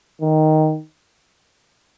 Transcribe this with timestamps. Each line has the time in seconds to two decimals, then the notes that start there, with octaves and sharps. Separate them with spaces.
0.22 D#3